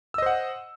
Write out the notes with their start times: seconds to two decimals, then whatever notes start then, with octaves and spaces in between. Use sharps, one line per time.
0.14 E6
0.18 D#5
0.22 C5
0.26 F#5